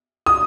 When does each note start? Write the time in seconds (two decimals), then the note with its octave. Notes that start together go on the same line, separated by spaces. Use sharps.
0.26 D#6